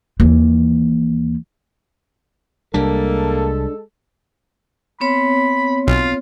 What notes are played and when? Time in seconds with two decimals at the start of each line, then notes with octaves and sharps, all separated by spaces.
0.20 D#2 E3
2.74 C2 G3 G#3 A#3 D4 A4
5.00 B3 C4 C#5 B5
5.87 B1 F4